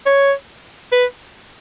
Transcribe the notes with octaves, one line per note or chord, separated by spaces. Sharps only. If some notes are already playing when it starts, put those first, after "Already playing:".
C#5
B4